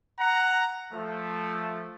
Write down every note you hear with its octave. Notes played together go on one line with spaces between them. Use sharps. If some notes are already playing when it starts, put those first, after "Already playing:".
F#5 A#5
F3 A3